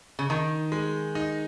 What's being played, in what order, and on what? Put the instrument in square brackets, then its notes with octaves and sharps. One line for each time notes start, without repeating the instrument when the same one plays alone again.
[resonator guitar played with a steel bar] C#3
[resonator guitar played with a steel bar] D#3 [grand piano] D#4
[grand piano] G#3
D#4